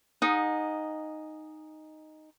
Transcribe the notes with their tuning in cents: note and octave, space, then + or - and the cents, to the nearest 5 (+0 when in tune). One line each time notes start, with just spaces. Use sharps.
D#4 -5 G#4 -15 F#5 -40